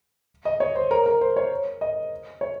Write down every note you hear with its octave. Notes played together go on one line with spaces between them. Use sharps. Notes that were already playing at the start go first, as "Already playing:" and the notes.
D#5
C#5
C5
A#4
A#4
C5
C#5
D#5
C#5